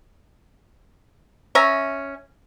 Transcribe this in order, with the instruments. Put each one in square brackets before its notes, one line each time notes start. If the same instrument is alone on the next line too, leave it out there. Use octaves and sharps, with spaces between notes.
[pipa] C#4 E5 A#5